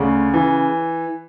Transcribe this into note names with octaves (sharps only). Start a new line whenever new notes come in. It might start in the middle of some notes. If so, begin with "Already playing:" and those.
Already playing: D2 C#3
E3